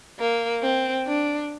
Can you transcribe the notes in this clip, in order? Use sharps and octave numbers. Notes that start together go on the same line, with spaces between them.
A#3
C4
D4